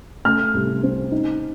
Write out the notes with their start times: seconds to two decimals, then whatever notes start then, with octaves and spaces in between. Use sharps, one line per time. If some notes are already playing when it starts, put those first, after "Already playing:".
0.25 A3 F6
0.54 C2
0.83 C4
1.12 D#4